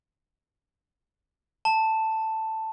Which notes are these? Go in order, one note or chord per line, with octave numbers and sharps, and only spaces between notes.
A5